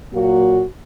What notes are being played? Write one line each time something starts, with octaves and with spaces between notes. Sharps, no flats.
A#2 F#3 A#3 F#4